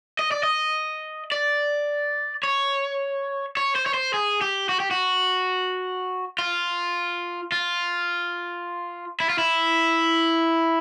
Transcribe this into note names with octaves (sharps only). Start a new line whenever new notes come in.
D#5
D5
D#5
D5
C#5
C#5
C5
C#5
C5
G#4
G4
F#4
G4
F#4
F4
F4
E4
F4
E4